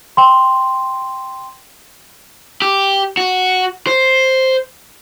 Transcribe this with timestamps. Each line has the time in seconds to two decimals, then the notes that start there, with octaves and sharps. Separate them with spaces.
0.17 G5 C6
2.62 G4
3.17 F#4
3.87 C5